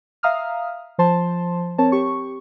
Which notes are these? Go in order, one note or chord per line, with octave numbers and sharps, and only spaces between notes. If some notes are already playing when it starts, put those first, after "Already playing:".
E5 F5 A#5 D#6 F6
F3 C5 A5 C6
C4 A#4 C#5 A5
G4 C#6